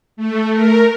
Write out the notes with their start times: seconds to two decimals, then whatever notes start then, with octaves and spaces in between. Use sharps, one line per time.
0.17 A3
0.52 A#4